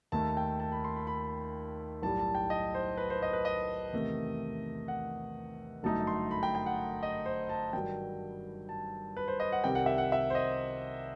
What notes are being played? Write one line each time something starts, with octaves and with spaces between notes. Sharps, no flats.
D#2 D#3 A3 A5
G5
A5
B5
C6
B5
B5
B1 A2 G3 A5
A5
G5
D#5
C5
B4
C5
D#5
B4
D#5
E2 C3 D#3 A3
F#5
G1 F#2 F#3 A3 D#4 A5
C6
B5
G5
G5
F#5
D#5
C5
A5
G2 D#3 F#3 G5
A5
B4
C5
D#5
F#5
C2 C3 D#3 G3 G5
F#5
E5
F#5
E5
C5
D#5